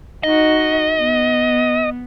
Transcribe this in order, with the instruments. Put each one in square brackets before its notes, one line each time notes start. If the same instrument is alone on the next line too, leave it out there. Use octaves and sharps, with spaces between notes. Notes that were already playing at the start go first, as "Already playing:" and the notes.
[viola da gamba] D#4 F#4 [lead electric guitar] D#5
[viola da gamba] B3